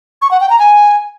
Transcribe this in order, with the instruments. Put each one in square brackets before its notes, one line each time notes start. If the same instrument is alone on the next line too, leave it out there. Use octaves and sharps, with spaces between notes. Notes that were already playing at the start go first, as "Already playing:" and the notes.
[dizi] C#6
F#5
G5
A#5
G#5